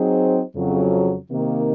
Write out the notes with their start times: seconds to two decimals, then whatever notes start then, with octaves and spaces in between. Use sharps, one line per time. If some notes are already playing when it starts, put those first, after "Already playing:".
Already playing: F#3 C4 D#4 G#4 C5
0.56 F2 C#3 F#3
1.31 C3 D#3 A#3